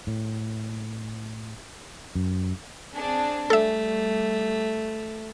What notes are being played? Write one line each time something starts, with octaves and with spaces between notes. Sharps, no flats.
A2
F#2
C4 D4 G#4
G3 A3 A4 E5